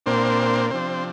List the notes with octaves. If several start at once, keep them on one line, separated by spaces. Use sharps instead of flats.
A#2 A#3 C4 D4 C5
C3 F3 C4 D4 C5